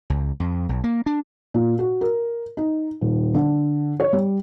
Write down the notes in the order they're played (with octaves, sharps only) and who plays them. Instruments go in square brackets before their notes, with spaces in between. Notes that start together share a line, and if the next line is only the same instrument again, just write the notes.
[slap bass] C#2
F2
B1
A#3
D4
[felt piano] A#2
F#4
A#4
D#4
D#1
D3
C#5
G3